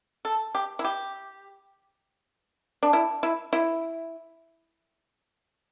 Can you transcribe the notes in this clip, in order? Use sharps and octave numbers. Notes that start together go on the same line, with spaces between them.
A4
G4
E4
G4
D4
E4
E4
E4